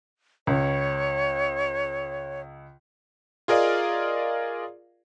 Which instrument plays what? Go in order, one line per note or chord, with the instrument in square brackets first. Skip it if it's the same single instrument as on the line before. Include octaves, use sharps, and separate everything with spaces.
[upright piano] C#2 [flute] C#5
[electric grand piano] F4 G#4 A#4 D5 D#5 F5